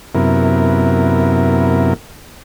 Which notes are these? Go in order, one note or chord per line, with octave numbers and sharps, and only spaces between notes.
F#2 C3 B3 E4 A#4